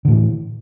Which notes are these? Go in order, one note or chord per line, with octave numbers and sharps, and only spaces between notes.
A2 D3 E3